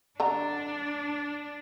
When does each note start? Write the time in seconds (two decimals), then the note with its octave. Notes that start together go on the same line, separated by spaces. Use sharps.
0.20 D3 D4 A#5